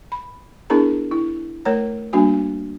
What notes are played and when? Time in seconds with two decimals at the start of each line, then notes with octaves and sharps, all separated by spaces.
0.12 B5
0.70 B3 D4 E4 G#4 A#4 A#5
1.12 E4
1.65 A3 A#4 C#5 A#5
2.13 G3 A#3 D4 F#4 G#5